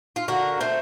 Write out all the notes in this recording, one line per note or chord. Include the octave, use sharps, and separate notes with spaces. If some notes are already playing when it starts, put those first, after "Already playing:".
F4
D3 F#4 A#4
A3 C4